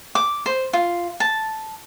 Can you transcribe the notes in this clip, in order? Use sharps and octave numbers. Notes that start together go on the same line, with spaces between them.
D6
C5
F4
A5